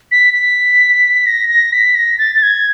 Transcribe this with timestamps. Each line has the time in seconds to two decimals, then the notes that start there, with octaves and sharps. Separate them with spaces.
0.11 B6
0.34 B6
1.27 A#6
1.49 A#6
1.73 B6
1.95 A#6
2.19 A6
2.35 A6
2.42 G#6